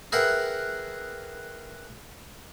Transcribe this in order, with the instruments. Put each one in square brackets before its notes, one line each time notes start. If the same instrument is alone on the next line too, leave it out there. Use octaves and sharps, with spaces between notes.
[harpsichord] G#4 A#4 B4 E5 F#5 G5